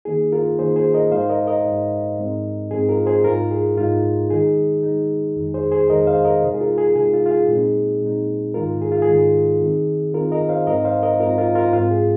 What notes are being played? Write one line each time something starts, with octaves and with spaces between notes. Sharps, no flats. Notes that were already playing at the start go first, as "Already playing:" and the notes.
D#3 A#3 D#4 G#4
F4 A#4
D#3 A#3 D#4 G#4 C5
G#4 C5
A#4 D#5
G#2 G#3 D#4 C5 F5
A#4 D#5
A#4 D#5
G#2 G#3 D#4
G#2 G#3 C4 D#4
G#2 G#3 C4 D#4 G#4
F4 A#4
G#4 C5
G#2 G#3 D#4 F4 A#4
G#4
G#2 G#3 D#4 F4
D#3 G#3 D#4 G#4
D#3 G#3 D#4
F2 D#3 G#3 D#4
G#4 C5
G#4 C5
F2 D#3 G#3 D#4 A#4 D#5
C5 F5
A#4 D#5
C3 G#3 D#4
G#4
F4 A#4
G#4
C3 G#3 D#4 G#4
F4
F4
G#4
A#2 G#3 C4 D#4
A#2 G#3 C4 D#4
G#2 D#3 G#3 D#4 F4 A#4
G#4
F4
G#4
G#2 D#3 G#3 D#4
D#3 C4 D#4
D#3 C4 D#4 F4 A#4
A#4 D#5
C5 F5
G#2 G#3 C4 D#4 A#4 D#5
C5 F5
A#4 D#5
G#2 G#3 C4 D#4 F4 A#4
F4 A#4
F4 A#4
G#2 G#3 C4 F4
G#4